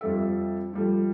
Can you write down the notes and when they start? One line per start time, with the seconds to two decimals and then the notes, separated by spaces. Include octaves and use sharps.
0.01 F2 G3 A4 E5
0.73 F3 G3 A3